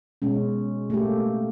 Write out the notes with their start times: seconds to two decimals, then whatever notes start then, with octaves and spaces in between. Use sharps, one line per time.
0.22 B2 G#3 C#4
0.90 A3 A#3 G4